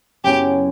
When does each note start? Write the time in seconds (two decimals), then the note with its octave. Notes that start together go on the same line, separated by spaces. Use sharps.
0.24 F#2 C#3 F#3 B3 E4 G4